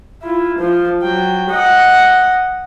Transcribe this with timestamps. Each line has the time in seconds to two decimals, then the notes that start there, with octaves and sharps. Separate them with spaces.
0.23 E4 F4
0.59 F3 C5
1.02 F#3 G5
1.51 D#5 F#5